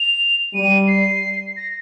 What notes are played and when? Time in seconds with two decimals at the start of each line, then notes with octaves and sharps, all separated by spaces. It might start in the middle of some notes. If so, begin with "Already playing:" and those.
Already playing: F7
0.54 G3 D#7
0.87 C7
1.57 A#6